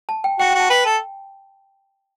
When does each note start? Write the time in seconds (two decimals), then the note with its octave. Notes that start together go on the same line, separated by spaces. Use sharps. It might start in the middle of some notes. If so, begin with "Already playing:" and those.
0.09 A5
0.24 G5
0.39 F#4 G5
0.50 G5
0.54 F#4
0.60 A5
0.70 B4 G5
0.86 A4